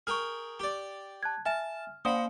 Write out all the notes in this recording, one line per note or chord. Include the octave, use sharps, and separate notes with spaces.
G#4 A#4 G5 C#6 F6
G4 D5
A5 F#6 G#6
E5 G#5 A5 F6
A#3 C5 D5 F5 B5 D#6